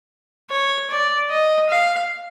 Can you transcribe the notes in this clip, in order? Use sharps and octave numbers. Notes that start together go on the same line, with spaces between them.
C#5
D5
D#5
F5